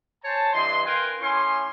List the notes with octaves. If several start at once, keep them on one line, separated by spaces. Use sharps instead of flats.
C5 C#5 G#5 A5
G2 E3 D#5 C6
A#4 B4 F5 G5 G#5 C6
A2 C#4 E4 G#5 C6